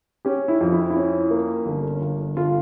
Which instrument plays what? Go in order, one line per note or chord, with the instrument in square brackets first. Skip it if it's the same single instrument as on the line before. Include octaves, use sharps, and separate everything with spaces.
[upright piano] C#4 G4
E4
F2
E4
E4
C#4
A#3
G1
G1
G1 F4